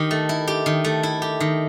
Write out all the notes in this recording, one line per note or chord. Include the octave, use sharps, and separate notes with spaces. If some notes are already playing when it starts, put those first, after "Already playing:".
Already playing: D#3 G4
A3
E4
G4
D#3
A3
E4
G4
D#3